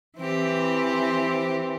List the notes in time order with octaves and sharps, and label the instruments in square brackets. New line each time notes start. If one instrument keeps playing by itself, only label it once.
[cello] E3 [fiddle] C4 G4